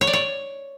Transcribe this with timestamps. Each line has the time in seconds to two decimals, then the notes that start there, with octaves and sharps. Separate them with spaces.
0.01 C#5
0.07 D5
0.13 C#5